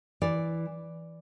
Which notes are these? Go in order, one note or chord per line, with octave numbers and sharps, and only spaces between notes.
E3 D5